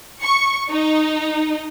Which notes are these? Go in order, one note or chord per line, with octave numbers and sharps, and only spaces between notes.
C#6
D#4